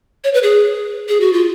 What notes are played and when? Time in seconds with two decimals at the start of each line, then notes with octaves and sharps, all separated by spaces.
0.24 C#5
0.34 B4
0.43 G#4
1.09 G#4
1.20 F#4
1.33 F4